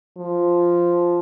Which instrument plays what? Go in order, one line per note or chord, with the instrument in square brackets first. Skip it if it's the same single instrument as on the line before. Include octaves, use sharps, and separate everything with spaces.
[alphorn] F3